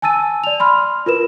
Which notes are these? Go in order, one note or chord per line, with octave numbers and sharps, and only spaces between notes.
G#5 A5 E6 A6 D#7
D5 F7
B5 C6 F6
F4 A#4 B4 E7